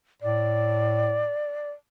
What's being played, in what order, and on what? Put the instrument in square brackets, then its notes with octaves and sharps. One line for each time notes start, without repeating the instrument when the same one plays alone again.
[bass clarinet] A2 [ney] D5